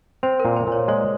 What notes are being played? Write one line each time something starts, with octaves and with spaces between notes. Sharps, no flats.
C4 C5
A#2 A#4
C5
A#2 C#5
G#3 C#5